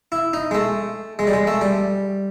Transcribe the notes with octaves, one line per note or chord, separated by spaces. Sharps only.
E4
D#4
G#3
A3
G#3
G3
G#3
A3
G3